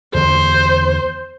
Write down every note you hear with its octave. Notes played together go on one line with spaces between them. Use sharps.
E2 D3 D#3 C5